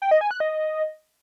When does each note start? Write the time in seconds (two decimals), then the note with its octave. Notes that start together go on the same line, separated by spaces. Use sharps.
0.02 G5
0.11 D#5
0.21 G#5
0.31 F#6
0.40 D#5